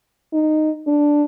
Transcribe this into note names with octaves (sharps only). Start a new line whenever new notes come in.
D#4
D4